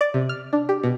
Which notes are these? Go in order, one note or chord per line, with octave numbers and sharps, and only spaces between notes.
D5
C3
F6
D4
G4
B2